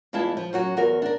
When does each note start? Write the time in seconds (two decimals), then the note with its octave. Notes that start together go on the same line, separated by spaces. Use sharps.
0.13 E2 G#3 E4 F4 A5
0.37 F3
0.53 F#2 F#3 F#4
0.77 E2 F#4 A#4
1.02 D4 A#4